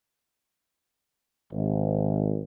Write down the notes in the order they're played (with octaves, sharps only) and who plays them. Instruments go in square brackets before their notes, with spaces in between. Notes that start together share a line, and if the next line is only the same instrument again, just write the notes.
[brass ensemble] G#1